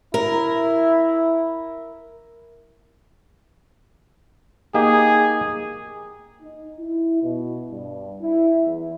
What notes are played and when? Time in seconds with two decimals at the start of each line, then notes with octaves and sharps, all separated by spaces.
0.14 E4 A#4
4.74 A#3 D#4 G4 G#4
6.41 D#4
6.78 E4
7.22 B2
7.70 G2
8.20 E4
8.64 E2